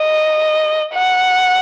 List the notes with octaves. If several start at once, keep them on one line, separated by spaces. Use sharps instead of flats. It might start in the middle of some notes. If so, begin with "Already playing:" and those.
Already playing: D#5
F#5